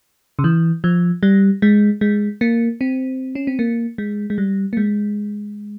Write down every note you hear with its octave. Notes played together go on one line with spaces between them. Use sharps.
C#3
E3
F3
G3
G#3
G#3
A#3
C4
C#4
C4
A#3
G#3
G#3
G3
A#3
G#3